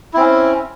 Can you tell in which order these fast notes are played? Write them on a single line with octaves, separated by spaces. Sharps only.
E4 C4 C#4